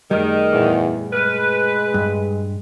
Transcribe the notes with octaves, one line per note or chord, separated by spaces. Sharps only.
F#2 D#3 G3 A3 G#4
E2 A#2
G#3 B4 F6
G2